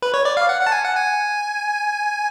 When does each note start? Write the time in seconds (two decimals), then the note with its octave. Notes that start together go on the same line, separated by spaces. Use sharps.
0.02 B4
0.14 C#5
0.25 D5
0.37 F5
0.49 F#5
0.61 F#5
0.67 A5
0.72 G#5
0.84 F#5
0.96 G#5